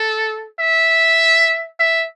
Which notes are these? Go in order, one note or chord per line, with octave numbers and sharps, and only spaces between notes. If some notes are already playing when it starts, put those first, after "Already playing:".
Already playing: A4
E5
E5